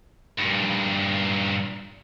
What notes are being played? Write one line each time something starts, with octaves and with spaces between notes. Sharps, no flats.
G2 A#2